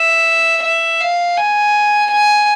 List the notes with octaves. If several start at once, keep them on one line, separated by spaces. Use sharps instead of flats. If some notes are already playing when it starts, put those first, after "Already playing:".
Already playing: E5
E5
F5
G#5
G#5